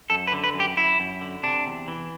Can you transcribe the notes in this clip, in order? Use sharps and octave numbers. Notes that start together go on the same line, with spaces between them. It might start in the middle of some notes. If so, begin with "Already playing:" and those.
F#2 A4
B4
D3
B4
F#2
G4
F#2 E4
F#2
D3
C3 D4
E2
E3